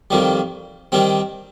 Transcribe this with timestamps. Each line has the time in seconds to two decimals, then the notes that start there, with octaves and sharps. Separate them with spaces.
0.10 F2 D#3 G3
0.92 D#3 G3 C4